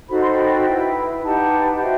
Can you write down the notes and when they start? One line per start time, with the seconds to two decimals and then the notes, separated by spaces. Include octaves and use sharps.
0.09 D#4 F#4 A4 C5 B5
0.20 C6
0.31 G5 B5
0.67 E4 B4
1.23 D#4 G4 B4 F#5 A5
1.75 F#5
1.81 F#4 C5 E5 G5